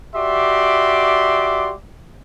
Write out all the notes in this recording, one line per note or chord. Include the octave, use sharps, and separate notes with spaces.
F#4 G4 D5 E5 C6 D6